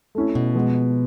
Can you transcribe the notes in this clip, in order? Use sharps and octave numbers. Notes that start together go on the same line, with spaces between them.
A3 C#4 E4
B2
F3 G#3 B3